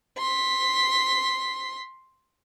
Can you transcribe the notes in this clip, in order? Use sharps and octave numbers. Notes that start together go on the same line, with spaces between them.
C6 B6